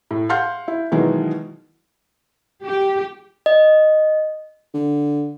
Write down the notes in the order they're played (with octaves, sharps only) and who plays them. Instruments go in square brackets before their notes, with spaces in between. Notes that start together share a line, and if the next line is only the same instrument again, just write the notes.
[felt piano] A2
F5 F#5 C6 F6 G6
E4
B2 D#3 E3 F#3 G#3
[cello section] G4
[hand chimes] D#5
[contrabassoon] D3